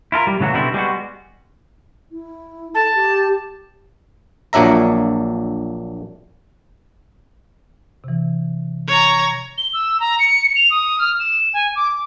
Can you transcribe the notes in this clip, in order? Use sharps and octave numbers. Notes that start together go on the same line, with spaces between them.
E4 F4 A4 A#4
G3
A2 C#3 E3 F#3 F#4
B2 D3 G3 C4 E4
G3 G#3 B3 F#4
E4
A4 A5
G4
A#1 A#2 F#3 D4 E5 A#5
C3 E3
C#5 A#5
G7
E6
A#5
C#7
F7
D#6
F6
E7
G#5
D6